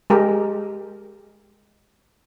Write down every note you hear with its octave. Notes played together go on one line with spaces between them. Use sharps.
G#3 G4 A#4